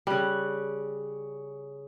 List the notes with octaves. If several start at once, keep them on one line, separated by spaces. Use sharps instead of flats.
C#3 G3 F#6